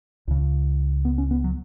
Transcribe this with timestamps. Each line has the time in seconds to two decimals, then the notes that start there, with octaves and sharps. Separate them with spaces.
0.28 C#2 C#3
1.05 B3
1.18 C#4
1.31 B3
1.44 F#3